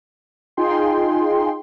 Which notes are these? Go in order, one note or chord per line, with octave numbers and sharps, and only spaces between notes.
D#4 F4 G#4 G5 C6